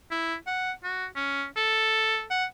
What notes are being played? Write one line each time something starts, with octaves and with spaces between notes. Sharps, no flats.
E4
F#5
F#4
C#4
A4
F#5